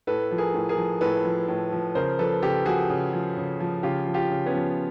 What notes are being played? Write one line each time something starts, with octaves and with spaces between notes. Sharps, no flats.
A2 A4 B4
F3
G#4 A#4
A2
G#4 A#4
F3
A2 A4 B4
F3
A2
F3
C#3 A#4 C5
F3 A4 B4
C#3 G4 A4
F3 F#4 G#4
C#3
F3
C#3
F3
C#3 F4 G4
F3
F4 G4
C#3
B3 C#4
F3